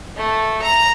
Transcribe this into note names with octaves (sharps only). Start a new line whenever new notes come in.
A3
A#5